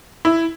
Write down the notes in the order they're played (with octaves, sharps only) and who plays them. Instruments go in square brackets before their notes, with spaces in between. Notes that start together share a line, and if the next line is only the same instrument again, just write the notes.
[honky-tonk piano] E4